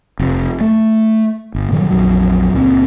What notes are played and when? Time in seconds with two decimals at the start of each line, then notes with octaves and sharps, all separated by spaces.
0.19 F1
0.61 A3
1.55 G1
1.72 A#2 D#3 F#3 G3
1.91 A#1 F2 F#3
2.53 C#2 A#2 C4